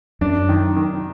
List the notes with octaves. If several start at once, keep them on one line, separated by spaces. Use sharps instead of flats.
F#2 D4
D#3
D#3